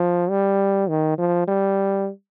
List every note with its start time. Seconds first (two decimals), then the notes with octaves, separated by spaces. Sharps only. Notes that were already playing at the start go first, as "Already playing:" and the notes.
Already playing: F3
0.30 G3
0.89 D#3
1.18 F3
1.48 G3